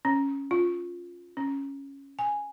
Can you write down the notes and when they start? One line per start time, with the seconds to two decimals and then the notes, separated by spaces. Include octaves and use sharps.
0.05 C#4
0.51 F4
1.37 C#4
2.19 G#5